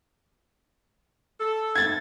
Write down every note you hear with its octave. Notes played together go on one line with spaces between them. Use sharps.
A4
G#6 A6